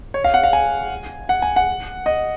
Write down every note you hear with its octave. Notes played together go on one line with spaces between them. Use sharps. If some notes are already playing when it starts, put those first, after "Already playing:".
C#5
F5
F#5
F5
G#5
F#5
G#5
F#5
D#5